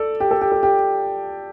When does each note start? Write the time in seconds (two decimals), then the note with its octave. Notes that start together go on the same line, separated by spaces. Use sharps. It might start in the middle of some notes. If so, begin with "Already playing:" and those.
Already playing: A4 D5
0.20 G4
0.31 A4
0.42 G4
0.52 A4
0.63 G4